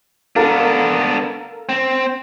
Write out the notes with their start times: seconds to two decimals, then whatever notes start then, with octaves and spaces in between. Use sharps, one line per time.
0.36 B3 D4 A4 A#4 F5
1.69 C4